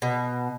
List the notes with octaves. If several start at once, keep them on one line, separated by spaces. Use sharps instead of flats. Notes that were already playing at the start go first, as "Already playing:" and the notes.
B2